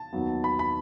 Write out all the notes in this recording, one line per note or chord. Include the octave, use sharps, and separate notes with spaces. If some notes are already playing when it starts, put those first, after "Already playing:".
Already playing: A5
D#2 D#3 F#3 B3
B5
B5